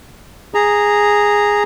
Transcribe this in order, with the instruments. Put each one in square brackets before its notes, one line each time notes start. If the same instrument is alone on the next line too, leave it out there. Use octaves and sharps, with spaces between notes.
[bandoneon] G#4 A#5